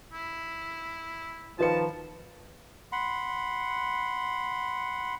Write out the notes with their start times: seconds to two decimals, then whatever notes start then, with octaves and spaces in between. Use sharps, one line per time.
0.13 E4
1.59 D#3 F3 F4 B4 A5 C#7
2.92 F#5 B5 C6